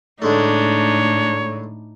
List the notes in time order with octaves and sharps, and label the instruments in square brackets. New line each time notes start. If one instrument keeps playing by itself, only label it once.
[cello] A2 [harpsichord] D3 G#3 A3 [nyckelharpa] D4 D#4 [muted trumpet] C#5